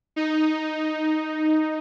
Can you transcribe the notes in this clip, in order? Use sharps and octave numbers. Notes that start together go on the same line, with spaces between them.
D#4